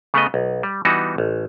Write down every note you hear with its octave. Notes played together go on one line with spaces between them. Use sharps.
C#3 A3 B3 D#5
B1
G3
E3 G3 B3 D#4 F#4
A1